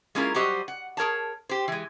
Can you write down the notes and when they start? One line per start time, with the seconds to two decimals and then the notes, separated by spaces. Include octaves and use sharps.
0.15 G#3 A#3 C#4 E4 F4 A#4
0.34 F#3 G3 F#4 G4 C5 D#5
0.68 F#5
0.97 G#4 A#4 C#5 A5
1.49 G4 C5
1.68 E3 G#3